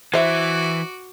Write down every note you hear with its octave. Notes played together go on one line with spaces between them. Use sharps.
E3 F#4 C5 E5 D6